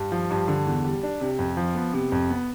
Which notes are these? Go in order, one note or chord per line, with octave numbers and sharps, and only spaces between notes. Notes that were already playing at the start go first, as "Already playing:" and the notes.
Already playing: G2
F3
G2
D3
E2
G3
D4
C3
F2
F3
B3
C3
F2
B3